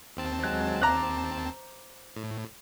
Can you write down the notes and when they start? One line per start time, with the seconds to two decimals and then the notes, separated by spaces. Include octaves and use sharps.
0.17 D#2 C4 A5
0.43 F#3 G#3 F#6
0.82 C5 A#5 D6 F#6
2.16 A2